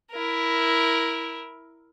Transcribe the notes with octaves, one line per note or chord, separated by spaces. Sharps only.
E4 A#4